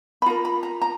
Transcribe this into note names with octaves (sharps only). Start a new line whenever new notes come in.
B5
F4 A#4 A#5
B5
A#5
A#5